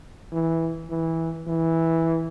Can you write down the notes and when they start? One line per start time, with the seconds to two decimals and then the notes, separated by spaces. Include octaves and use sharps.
0.32 E3
0.89 E3
1.47 E3